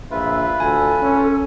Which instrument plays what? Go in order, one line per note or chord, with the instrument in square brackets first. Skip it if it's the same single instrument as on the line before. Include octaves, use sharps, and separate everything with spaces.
[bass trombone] A#1 [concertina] F4 B4 [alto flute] E5
[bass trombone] D2 [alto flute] A4 [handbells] G#5
[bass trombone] C#4